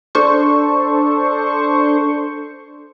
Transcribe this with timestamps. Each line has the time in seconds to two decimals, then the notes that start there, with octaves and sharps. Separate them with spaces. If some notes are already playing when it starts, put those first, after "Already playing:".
0.15 D4 A4 C5 C#6